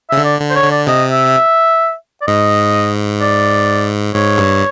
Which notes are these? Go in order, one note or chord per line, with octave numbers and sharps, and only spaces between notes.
C#3 E5
D3
D5
D3
C5
C#5
D3
D5
C3 D#5
E5
D5
G#2 D#5
D5
G#2 C#5
G2